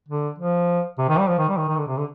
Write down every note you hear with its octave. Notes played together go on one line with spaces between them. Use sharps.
D3
F3
C3
D#3
G3
F3
D#3
G3
D#3
D#3
D3
C3
D3